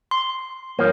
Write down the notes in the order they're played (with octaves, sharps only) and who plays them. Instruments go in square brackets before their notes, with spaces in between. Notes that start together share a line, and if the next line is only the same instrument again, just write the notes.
[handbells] C6
[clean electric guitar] G2 F3 A#3 [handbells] C#5